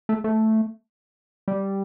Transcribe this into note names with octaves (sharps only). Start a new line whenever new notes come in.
A3
A3
G3